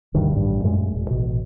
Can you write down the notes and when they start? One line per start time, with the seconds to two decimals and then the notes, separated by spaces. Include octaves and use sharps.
0.14 D2 G2 B2 D#3
0.32 A1 G2
0.64 F#2 A#2 G#3 A3
0.95 E1
1.10 A1 B2